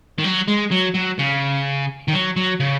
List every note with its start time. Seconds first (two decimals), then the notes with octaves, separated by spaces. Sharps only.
0.19 D#3
0.24 F#3
0.48 G#3
0.72 F#3
0.94 F#3
1.19 C#3
2.08 D#3
2.13 F#3
2.36 F#3
2.60 C#3